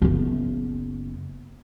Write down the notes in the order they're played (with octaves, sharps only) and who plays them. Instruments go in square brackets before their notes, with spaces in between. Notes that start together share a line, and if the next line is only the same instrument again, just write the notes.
[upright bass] F#1 B3